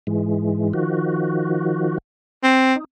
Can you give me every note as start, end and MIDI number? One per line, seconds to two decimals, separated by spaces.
0.07 0.73 44
0.07 0.73 52
0.07 0.73 56
0.73 1.98 51
0.73 1.98 53
0.73 1.98 66
2.43 2.74 60
2.76 2.84 63